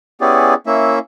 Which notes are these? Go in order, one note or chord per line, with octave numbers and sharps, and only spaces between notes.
B3 C#4 E4 G4 G#4 D5
A#3 C#4 E4 E5